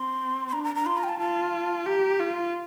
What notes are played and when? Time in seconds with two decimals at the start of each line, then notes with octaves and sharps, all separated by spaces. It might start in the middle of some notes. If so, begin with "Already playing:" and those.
Already playing: C4 C6
0.48 C6
0.52 D4 A#5
0.64 A#5
0.75 A#5
0.86 F4 C6
0.97 A#5
1.04 G5
1.09 A5
1.20 F4 A5
1.86 G4 A#5
2.19 F4